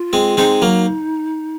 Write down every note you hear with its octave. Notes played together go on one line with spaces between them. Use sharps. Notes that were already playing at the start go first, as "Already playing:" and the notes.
Already playing: F4
G#3 C4
G#3 C4 D#4
F#3 A#3